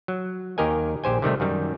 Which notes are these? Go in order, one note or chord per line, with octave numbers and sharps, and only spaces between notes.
F#3
D#2 D#3 G4 A#4 D#5 G#5
A#1 G4 C5 G#5
C3 D#3 G3 A3
F#2 D#3 G3